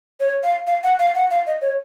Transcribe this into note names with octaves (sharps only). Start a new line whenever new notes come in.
C#5
F5
F5
F#5
F5
F#5
F5
D#5
C#5